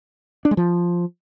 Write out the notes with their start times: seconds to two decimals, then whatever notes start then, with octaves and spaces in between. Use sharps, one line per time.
0.45 D4
0.51 G#3
0.57 F3